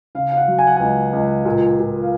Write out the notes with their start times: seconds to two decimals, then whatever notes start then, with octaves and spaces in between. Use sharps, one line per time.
0.15 C#3 F5
0.32 F5
0.37 F#5
0.48 F#3
0.59 G#5
0.67 F#5
0.77 C#2 G#5
1.13 C#2
1.45 A#2
1.79 A#2
2.02 F5